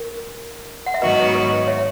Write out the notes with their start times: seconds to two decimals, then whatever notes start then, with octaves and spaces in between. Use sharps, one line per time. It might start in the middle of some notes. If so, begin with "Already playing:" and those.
Already playing: A#4
0.86 F#5
0.94 E5
1.01 G#2 D#3 F#3 B3 F#4 B4 D#5
1.35 B4 D#5
1.67 C#5 E5